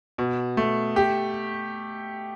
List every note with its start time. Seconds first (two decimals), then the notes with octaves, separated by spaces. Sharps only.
0.18 B2
0.57 A3
0.96 G4